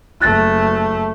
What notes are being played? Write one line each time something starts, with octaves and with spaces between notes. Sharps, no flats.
F#1 A3 F#6 A6